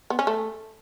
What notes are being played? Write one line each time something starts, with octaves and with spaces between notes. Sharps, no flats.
B3
C#4
A3